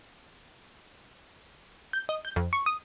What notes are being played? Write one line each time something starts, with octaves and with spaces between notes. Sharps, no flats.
G6
D#5
G6
F2
C#6
D#6